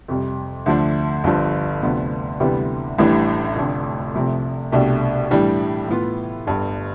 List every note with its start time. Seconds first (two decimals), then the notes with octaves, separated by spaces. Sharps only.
0.08 F2 C3 G3
0.66 D2 D3 F3 A3 D4
1.24 G1 G2 F3
1.82 D2 C3 F3 B3
2.40 D2 C3 E3 G3 B3
2.98 A1 A2 E3 G3 D4
3.56 F1 F2 D3
4.14 C2 C3 F3 A3
4.72 C2 B2 A3 D4 G4
5.31 A2 E3 G3 D4 G4
5.88 A2 E3 B3 F4
6.47 G1 G2 D3